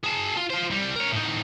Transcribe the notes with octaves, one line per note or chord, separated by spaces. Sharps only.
G#4 A5
F4
F4 C5
C2 G3
A#4 C#5
A2 D#4